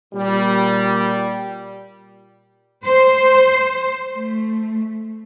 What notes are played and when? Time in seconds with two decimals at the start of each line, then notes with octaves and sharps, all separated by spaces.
0.14 A#2 G3
2.85 C5
4.15 A3